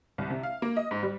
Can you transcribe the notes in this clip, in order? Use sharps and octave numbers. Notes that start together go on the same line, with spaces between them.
C2
C3
F5
A#3
D#5
G#2
G3